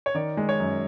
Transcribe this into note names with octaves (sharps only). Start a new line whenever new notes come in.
C#5
D#3 D5
G#3
C#5
F#2